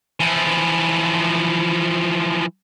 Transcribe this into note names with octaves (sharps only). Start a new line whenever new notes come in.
E3 F3